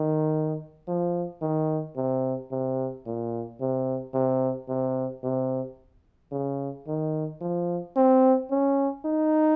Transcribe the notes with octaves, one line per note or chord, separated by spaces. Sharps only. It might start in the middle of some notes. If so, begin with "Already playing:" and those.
Already playing: D#3
F3
D#3
C3
C3
A#2
C3
C3
C3
C3
C#3
D#3
F3
C4
C#4
D#4